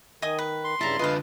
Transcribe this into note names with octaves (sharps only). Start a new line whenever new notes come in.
D#3 D#5 G#5 D#6
B4
C6
G2 C#3 G3 E4 A5 A#5
D3 F4 B4 D#5 F5